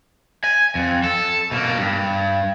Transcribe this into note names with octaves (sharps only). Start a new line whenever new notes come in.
G#5
F2
A4
B2 A#3
G2